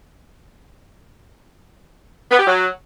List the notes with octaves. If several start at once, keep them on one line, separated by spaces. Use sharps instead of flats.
B3
G4
F#3